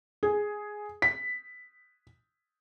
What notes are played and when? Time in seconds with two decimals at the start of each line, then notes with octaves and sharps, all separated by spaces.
0.23 G#4
1.02 B6